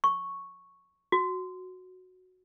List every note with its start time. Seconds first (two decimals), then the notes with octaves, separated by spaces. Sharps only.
0.04 C#6
1.12 F#4